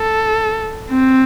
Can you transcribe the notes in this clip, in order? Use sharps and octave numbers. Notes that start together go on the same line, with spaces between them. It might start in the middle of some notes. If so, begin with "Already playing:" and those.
Already playing: A4
C4